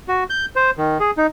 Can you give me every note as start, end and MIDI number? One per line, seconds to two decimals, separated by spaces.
0.08 0.24 66
0.30 0.46 91
0.56 0.71 72
0.78 0.98 51
1.00 1.11 68
1.17 1.27 63